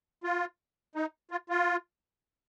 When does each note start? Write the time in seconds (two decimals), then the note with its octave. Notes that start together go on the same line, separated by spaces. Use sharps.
0.24 F4
0.95 D#4
1.31 F4
1.49 F4